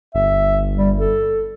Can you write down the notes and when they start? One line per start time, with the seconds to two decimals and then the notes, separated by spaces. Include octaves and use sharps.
0.15 G1 E5
0.77 G3
0.97 A4